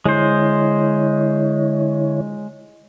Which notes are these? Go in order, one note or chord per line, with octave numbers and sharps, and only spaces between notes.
D3 G#3 E4 C5 C#5